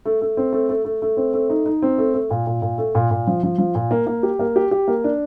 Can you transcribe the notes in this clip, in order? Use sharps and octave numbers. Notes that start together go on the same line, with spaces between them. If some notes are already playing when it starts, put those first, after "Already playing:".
A3
A3
C4
A3
A3
A3
A3
C4
A3
D#4
D#4
C4
A3
A3
A#2
A#2
A#2
A3
A#2
A#2
F3
F3
F3
A#2
A#3
A#3
G4
A#3
G4
G4
A#3
D4